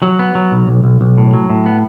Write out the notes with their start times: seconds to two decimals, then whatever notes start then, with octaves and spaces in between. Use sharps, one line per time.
0.02 F#3
0.19 B3
0.35 F#3
0.52 B1
0.67 B1
0.84 B1
1.01 B1
1.18 A2
1.34 F#3
1.50 A2
1.66 B3